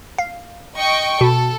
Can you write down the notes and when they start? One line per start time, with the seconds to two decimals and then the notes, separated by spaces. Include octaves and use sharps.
0.18 F5
0.76 D#5 G5 C#6
1.21 B2 A4